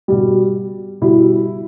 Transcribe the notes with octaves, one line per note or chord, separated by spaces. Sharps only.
B2 G3
B2 G3 E4